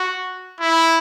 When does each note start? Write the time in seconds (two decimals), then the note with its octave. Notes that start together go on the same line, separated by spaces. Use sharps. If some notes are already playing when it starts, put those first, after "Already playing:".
Already playing: F#4
0.61 E4